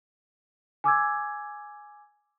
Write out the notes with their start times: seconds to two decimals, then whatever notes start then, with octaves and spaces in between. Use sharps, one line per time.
0.84 G#5 D6 E6 G#6